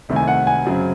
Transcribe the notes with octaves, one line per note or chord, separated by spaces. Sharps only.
C2 C3 D#3 A3
G#5
F#5
G#5
F#2 C#3 F#3 C4